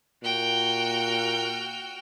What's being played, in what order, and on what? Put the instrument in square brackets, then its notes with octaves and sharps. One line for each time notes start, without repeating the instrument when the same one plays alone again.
[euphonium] A#2 [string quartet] F#4 G5 F6